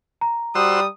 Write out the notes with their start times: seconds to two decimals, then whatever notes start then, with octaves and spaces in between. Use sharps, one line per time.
0.21 A#5
0.55 G3 F#4 C5 D#6 E6